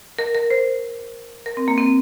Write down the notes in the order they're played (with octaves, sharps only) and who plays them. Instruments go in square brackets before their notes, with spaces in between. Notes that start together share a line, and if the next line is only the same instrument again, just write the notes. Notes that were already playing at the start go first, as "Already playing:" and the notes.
[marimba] A#4
A#4
C5
A#4
C4
A#3
C4